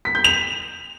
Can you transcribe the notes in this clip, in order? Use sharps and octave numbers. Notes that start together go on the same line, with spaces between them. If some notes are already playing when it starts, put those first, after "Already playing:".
B6
G6
F7